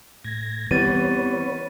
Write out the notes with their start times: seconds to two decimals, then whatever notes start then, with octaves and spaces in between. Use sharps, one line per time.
0.24 A2 G#6 A#6
0.71 E3 G3 B3 C4 B4 C#5 A6 D#7